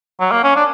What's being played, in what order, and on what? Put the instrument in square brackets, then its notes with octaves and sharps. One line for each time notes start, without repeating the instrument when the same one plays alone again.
[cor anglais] F#3
A#3
C#4
D4